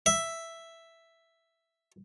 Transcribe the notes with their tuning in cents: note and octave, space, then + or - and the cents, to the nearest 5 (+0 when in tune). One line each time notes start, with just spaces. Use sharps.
E5 +5